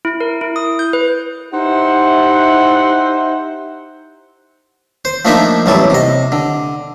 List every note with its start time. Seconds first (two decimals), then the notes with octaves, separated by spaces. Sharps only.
0.05 E4
0.20 A#4
0.41 E4
0.56 D#6
0.79 G6
0.93 B4
1.53 D#4 E4 G4 C5 E5 F#5
5.05 C5
5.25 F3 A3 A#3 D4 D#4 E5
5.66 A1 E2 F#3 G3 A4
5.90 C3 D#5
6.32 D3